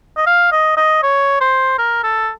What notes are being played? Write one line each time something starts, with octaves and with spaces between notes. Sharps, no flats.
D#5
F5
D#5
D#5
C#5
C5
A#4
A4